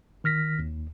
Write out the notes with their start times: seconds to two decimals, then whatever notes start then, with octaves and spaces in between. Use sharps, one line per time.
0.24 D#3 F6 A#6 B6
0.59 D#2